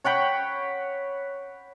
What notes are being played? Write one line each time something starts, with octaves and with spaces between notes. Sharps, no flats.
C#5 F#5 G5 B5